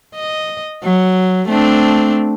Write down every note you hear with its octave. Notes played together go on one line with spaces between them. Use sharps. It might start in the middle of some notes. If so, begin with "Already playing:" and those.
D#5
F#3
A3 C4 D4